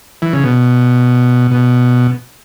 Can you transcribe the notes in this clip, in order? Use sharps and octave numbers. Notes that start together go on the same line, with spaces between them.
E3
C#3
B2
B2